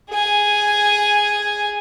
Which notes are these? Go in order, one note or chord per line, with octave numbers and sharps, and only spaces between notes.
G#4 G#5